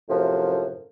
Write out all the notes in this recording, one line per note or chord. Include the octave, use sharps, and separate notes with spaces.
F#2 A2 C3 F3